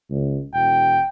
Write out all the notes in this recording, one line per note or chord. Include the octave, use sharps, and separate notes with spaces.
C#2
E1 G5